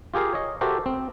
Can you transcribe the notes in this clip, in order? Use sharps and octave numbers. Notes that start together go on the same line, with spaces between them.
F4 G4 G#4 A#4 F5
C#5 D#5
F#4 G4 A4 A#4 C5 E5
C4